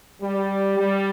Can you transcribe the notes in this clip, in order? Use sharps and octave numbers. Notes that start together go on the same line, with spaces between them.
G3
G3